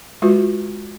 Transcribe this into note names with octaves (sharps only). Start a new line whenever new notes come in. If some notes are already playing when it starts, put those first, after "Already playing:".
G#3 F4 F#4 B4